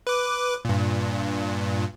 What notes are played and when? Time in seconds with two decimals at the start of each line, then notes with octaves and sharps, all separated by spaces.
0.07 B4 D6
0.65 G2 A#2